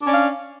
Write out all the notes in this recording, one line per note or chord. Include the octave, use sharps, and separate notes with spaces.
C#4 D4 D5 F5